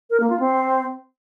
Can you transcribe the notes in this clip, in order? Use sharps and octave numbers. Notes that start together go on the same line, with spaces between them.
A#4
A#3
F4
C4